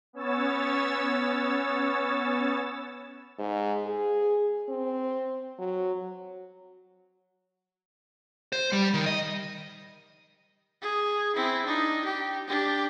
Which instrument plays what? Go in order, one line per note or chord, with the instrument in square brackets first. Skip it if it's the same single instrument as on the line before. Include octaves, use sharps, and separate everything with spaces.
[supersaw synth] B3 C#4 C#5 E6 A6
[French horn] G#2
G#4
C4
F#3
[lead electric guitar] C5
G3
D#3
D#5
[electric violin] G#4
C4 E4
D4 D#4
G4
D4 G4